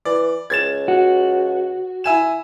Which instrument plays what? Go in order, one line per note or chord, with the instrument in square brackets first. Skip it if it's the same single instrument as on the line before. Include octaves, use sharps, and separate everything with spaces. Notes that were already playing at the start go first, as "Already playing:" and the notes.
[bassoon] E3 [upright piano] D5
[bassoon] C#2 [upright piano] G#6 A6 E7
[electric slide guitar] F#4
[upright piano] E4 G#5 E7